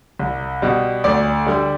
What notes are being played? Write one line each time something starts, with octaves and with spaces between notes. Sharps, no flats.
C2
B2 G3
D2 D5
D3 G3